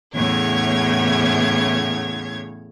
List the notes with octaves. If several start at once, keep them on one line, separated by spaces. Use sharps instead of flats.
E2 A2 C#3 C#5 G#6